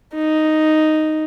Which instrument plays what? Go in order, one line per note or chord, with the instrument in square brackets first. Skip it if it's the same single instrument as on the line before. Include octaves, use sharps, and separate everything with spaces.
[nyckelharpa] D#4